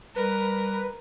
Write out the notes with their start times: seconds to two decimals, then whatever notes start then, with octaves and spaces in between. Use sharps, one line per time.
0.16 G3 A#4 B4